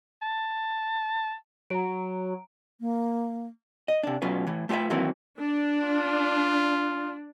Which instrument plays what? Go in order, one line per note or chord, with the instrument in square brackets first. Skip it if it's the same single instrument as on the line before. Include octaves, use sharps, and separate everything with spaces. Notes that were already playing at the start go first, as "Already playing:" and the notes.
[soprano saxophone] A5
[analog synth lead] F#3 [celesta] A#5 D7
[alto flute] A#3
[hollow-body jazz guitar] D#5
C3 D4
B2 F#3 C#4 F4 B4
A2 E3
A3 F4 G4 B4 E5
D#3 E3 F#3 A#3 C4 E4
[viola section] D4
[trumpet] F4